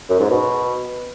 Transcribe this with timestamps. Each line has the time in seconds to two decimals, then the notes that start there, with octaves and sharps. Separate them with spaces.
0.10 F#2
0.20 G#2
0.30 B2